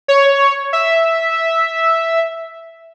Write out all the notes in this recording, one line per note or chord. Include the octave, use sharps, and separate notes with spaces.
C#5
E5